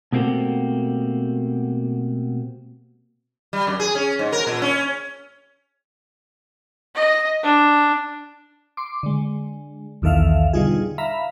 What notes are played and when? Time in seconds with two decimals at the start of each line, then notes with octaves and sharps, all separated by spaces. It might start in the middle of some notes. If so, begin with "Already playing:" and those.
0.12 B2 A3 A#3 C4 F#4 G4
3.53 G3
3.67 F#2
3.80 G#4
3.95 C#4
4.19 G#2
4.32 A#4
4.47 A#2
4.62 C#4
6.95 D#5
7.44 D4
8.77 C6 D6
9.03 D3 G#3
10.02 B1 E2 D#3 A4 E5 F5
10.53 B2 D3 G3 D#4 F4 G#4
10.98 E5 F5 A#5 B5